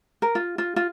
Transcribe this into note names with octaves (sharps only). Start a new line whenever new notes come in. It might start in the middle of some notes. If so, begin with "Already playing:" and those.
A#4
F4
F4
F4